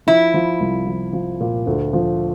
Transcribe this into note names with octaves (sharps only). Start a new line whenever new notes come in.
F3 E4
F3
C2
F3
F3
A#2
D2
F3